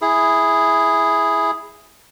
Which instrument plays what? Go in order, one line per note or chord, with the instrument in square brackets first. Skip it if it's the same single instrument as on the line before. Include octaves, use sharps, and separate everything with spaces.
[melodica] E4 G#4